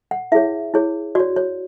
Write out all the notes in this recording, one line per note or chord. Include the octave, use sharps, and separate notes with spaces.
F#5
E4 G#4 C#5 E5
E4 G#4 C#5
F#4 C#5 D5
C#5